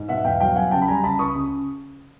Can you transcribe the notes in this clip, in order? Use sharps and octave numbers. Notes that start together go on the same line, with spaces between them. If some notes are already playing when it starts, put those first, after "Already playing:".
Already playing: G#2
B2 E5 F#5
E2 F5 G5
F#3 F5 G5
F#3 F#5 G#5
C#3 G5 A5
B5
G3 G#5 A#5
C#3 A5 B5
C#2 C#6 D#6
C#3